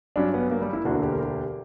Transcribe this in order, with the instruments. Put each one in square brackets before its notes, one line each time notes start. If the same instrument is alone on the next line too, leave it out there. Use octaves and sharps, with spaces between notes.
[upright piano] G2 F#3 C#4 [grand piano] D4
[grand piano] B3
A#3
G3
E4
[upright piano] E1 D2 D3 A#3 D4 [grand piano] F#4
[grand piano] G4
A#4
G4